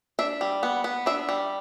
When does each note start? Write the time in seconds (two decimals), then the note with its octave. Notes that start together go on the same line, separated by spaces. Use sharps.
0.19 D4 E5
0.41 G3
0.63 B3
0.84 B3
1.06 D4 E5
1.29 G3